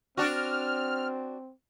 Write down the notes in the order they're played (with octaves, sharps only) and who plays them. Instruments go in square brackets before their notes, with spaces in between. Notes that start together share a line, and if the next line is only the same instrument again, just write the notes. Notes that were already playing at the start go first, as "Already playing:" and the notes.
[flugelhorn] C4 [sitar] D4 F#4 [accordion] F6